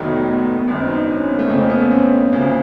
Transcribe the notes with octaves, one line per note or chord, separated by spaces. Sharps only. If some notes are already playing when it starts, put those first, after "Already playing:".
Already playing: F1 D#2 D#3 F#3 A3 B3
B3
B3
G#1 F#2 D#3 B3
C4
D#4
D4
C#4
B3
A#3
A3
F2 C#3 F3 A3 A#3
A#3
B3
C#4
C4
D2 C#3 F3 A#3